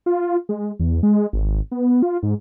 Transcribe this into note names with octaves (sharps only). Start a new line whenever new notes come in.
F4
G#3
E2
G#3
G#1
B3
F4
G#2